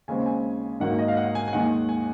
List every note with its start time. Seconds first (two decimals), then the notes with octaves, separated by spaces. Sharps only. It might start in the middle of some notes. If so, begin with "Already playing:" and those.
0.08 D#2 C#3 G#3 C4 G#5
0.26 G#5
0.80 G#2 D#3 F#3 A#3 F#5
0.99 D#5
1.08 F5
1.17 F#5
1.35 G#5
1.48 G#5
1.53 D#2 D#3 G#3 F#5
1.89 G#5